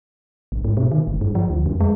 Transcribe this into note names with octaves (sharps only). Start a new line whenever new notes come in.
A1
G#2
B2
D#3
G1
G2
F3
D2
F2
G#3